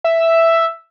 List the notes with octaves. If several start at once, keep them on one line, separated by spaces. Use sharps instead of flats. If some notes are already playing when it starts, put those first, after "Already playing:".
E5